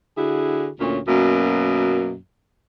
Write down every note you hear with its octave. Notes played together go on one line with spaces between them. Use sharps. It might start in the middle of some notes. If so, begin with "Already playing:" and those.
D3 E4 F#4 G#4
D2 A#2 C#4
F#2 B2 F#3 A#3